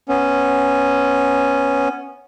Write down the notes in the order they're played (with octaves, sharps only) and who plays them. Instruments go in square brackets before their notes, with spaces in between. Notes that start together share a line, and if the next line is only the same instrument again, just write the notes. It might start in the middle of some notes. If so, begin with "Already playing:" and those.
[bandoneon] B3 C#4